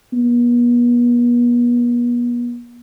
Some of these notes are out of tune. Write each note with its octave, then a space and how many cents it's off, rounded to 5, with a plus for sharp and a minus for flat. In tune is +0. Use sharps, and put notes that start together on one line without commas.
B3 -40